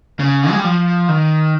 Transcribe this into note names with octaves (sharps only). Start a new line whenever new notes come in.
C#3
G#3
G3
F3
D#3